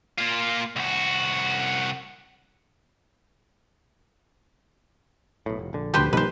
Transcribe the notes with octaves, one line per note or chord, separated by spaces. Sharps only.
A#3 F4
C2 F#4
B1 A2
F1
A#1 D3
D2 G4 B4 C5 A5
B1 D#3 F3 G3 A#3 B4 C5